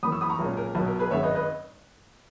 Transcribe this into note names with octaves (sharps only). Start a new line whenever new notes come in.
F#2 E3 A#3 B5 D#6
C#6 E6
B5 D#6
A#5 C#6
B1 A#2 G#3 C#4
A#4
B1 B2 F#3
A#4
G#4 B4
G#1 F#2 D#3 G#3 C#5 E5
B4 D#5
B4 D#5